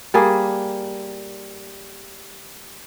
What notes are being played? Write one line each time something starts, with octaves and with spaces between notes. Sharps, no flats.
G3 A#3 G#4